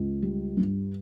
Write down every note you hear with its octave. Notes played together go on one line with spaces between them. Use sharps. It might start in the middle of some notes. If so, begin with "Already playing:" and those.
Already playing: C#2
G3
G2